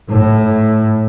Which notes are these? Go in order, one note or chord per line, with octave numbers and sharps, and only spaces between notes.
A2